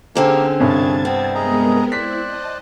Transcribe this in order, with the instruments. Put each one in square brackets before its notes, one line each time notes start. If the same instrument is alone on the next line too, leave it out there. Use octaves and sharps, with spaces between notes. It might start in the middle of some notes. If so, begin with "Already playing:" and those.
[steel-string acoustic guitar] D3 C4 C#4 [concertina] A#3 G4 A#4 [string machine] G#4 F6
[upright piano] C2 G2 [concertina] G#4 C#5 [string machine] A5 G#6 A6
[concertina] B3 [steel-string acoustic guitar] C4
[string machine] G#3 B3 A#4 [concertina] G#4 D#5 A#5
[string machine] E4 [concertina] C5 D5 F#6 [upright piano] B6
[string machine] D#5 A5